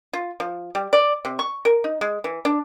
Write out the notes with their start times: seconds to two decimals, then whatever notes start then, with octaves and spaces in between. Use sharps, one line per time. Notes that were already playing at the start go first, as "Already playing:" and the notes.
0.13 F4
0.40 F3
0.75 G3
0.93 D5
1.25 C3
1.39 C#6
1.65 A#4
1.84 D#4
2.01 G#3
2.24 E3
2.45 D4